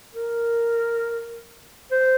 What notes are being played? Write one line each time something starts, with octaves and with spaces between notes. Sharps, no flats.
A#4
C5